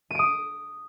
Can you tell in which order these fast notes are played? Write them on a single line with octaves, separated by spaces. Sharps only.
D#7 D7 D#6